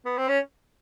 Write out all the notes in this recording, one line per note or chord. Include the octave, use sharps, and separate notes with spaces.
B3
C4
C#4